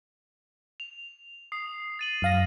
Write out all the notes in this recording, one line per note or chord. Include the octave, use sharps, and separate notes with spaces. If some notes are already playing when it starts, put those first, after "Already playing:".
F7
D#6 C7
A6 D#7 F#7
F#2 F5 A#6